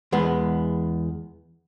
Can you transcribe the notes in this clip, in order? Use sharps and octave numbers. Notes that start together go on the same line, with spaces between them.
E2 G#3 B3